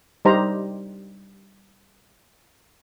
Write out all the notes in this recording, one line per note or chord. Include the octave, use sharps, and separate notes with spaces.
G3 D#4 G4 C5 A#5